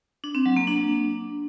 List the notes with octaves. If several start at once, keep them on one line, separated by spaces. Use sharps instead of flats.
D4
C4
F#3
A#3
D4